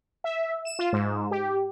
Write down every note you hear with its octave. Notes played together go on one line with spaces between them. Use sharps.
E5
E7
F4
G#2
G4